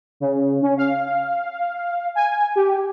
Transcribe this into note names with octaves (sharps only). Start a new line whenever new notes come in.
C#3
C#4
F5
G#5
G4